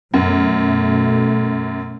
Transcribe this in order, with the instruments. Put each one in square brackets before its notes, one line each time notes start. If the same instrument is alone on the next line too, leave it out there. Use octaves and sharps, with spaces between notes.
[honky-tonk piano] F#2 [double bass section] B2 A3